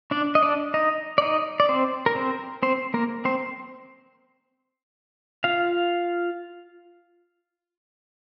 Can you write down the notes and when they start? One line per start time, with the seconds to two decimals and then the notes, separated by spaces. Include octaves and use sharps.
0.11 D4 D5
0.35 D#5
0.43 D4 D5
0.74 D#4 D#5
1.18 D5
1.22 D#4 D#5
1.60 D5
1.69 C4 C5
2.06 A#4
2.15 C4 C5
2.63 C4 C5
2.94 A#3 A#4
3.25 C4 C5
5.44 F4 F5